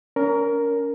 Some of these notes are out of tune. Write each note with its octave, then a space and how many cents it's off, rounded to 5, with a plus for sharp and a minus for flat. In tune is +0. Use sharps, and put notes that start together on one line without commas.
C#4 +35 A#4 +0